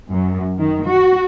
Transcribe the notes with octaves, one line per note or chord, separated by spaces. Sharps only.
F#2
D#3
F#4